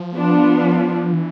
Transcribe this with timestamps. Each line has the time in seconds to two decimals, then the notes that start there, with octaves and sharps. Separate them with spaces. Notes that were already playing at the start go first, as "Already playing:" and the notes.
Already playing: F3
0.15 B3 D4 F4
1.13 E3